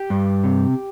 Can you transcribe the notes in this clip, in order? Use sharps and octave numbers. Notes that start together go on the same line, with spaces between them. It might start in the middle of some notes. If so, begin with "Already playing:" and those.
Already playing: G4
G2
C3